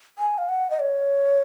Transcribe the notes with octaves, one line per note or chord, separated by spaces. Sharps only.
G#5
F5
F#5
D#5
C#5